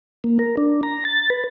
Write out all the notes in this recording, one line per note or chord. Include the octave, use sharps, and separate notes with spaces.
A#3
A#4
D4
A#5
A6
B4